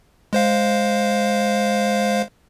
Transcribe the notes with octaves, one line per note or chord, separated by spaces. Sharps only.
G#3 C5 F5